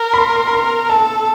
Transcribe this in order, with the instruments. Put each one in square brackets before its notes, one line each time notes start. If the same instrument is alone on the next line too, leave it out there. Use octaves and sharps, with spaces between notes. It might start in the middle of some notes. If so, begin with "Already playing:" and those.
Already playing: [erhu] A#4
[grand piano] B5
C6
C6
B5
C6
[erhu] A4 [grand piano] A5